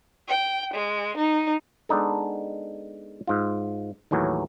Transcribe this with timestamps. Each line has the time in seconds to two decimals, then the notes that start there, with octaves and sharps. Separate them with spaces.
0.28 G5
0.73 G#3
1.16 D#4
1.89 G#3 B3 D4 D#4 A4
3.27 G#2 F4
4.11 D#2 A2 E3 F#3